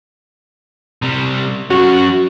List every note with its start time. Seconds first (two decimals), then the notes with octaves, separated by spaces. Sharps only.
1.02 C3 G3
1.70 F#3 C#4 F#4